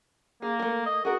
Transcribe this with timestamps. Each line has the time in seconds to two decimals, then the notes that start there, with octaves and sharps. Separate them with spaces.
0.42 A#3 G#4
0.59 A3 A#4
0.86 D#5
1.05 F#4 G#4 A#4